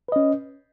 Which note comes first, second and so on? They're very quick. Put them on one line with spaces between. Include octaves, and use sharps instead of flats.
B4 D#5 C#4